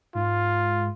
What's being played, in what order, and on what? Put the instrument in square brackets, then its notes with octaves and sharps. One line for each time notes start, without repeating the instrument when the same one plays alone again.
[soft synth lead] G#2 [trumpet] F4